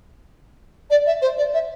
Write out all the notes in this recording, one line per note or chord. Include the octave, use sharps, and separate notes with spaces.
D5
E5
C5
D5
E5